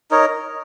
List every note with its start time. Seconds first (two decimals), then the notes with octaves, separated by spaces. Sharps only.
0.11 D#4 A#4 C#5